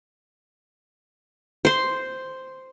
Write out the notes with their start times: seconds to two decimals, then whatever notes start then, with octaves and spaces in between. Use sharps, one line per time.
1.65 C5 C6